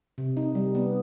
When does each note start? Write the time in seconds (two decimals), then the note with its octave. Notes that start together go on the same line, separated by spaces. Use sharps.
0.18 C3
0.37 D#4
0.55 G3
0.75 B3